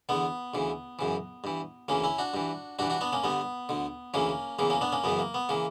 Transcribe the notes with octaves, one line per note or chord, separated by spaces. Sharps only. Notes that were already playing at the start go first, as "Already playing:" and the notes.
E2 D3 B3
D2 C#3 E3
F#2 C#3 E3
G2 E3
D2 C#3 E3 A#3 C#4
C#4 E4
D4 F#4
G2 E3
G2 E3 D4 F#4
D4 F#4
B3 D4
A#3 C#4
G2 D3 B3
D2 D3
D2 C#3 E3 A#3 C#4
E2 C#3 E3 A#3
A#3 C#4
B3 D4
A#3 C#4
F#2 C#3 E3 B3
A#3
B3
C#3 E3 A#3